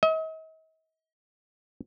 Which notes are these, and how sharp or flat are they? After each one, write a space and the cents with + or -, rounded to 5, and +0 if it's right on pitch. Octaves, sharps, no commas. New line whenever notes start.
D#5 +45